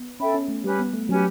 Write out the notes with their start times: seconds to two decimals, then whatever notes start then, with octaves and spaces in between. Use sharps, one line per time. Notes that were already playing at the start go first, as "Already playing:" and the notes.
Already playing: B3
0.20 C#4 A4 E5 G5 B5
0.34 C#4
0.49 A3
0.64 G3 C#4 G4 B4
0.79 B3
0.93 A3
1.08 F#3 C#4 G4 B4